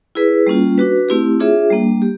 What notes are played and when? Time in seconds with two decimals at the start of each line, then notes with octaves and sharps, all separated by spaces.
0.15 E4 G#4 B4
0.47 G3 A#3 C#4 F4
0.78 D4 F#4 B4
1.09 A3 C4 E4 G4
1.40 D4 F4 G#4 C#5 E5
1.70 G3 A#3 D4
2.02 G4